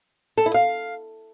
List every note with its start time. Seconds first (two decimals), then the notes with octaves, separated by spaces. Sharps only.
0.37 A4
0.46 E4
0.54 F5